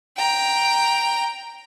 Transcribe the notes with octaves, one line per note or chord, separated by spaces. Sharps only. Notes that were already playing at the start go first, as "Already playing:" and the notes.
G5 A#5